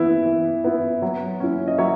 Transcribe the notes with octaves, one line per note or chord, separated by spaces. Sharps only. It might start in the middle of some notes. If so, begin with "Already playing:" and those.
Already playing: E3 B3 E4
E3
B3 E4
F#3
C#4 E4
D#5
F#3 C#5 E5